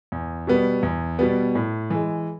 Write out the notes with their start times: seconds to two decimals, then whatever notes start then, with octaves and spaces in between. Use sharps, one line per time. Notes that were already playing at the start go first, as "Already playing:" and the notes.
0.12 E2
0.47 B2 G3 B3
0.83 E2
1.19 B2 G3 B3
1.55 A2
1.90 E3 G#3